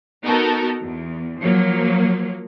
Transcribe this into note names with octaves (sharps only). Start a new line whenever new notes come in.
B3 D#4 F#4 A4 A#4
E2
F3 F#3 A#3